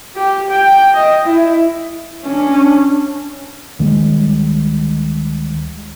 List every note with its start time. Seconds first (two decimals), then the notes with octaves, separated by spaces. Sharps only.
0.16 G4
0.50 G5
0.94 D#5
1.25 E4
2.26 C#4 D4
3.79 D2 D#3 G3 G#3